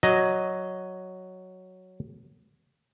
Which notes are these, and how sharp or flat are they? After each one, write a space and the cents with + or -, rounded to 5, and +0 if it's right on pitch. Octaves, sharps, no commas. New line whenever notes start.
F#3 +0 D#5 +0